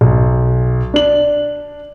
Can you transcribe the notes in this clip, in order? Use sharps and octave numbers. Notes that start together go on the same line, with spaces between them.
B1
D4 F#7